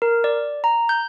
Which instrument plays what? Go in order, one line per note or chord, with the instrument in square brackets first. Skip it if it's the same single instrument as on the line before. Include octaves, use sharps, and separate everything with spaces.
[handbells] A#4
D5
A#5
G6